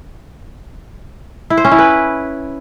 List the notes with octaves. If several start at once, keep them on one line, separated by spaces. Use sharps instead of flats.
E4
C5
C#4
E4
B4